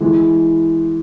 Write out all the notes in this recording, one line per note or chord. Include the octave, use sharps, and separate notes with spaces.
E3 G#3